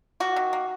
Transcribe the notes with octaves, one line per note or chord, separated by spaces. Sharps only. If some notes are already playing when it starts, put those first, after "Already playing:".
A#3 F#4
D#3
A#3